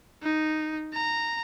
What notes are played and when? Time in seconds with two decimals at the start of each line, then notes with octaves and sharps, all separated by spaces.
0.23 D#4
0.93 A#5